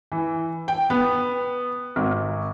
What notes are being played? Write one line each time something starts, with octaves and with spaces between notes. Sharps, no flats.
E3
G5
B3
G#1